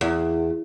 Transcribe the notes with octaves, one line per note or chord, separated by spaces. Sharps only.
E2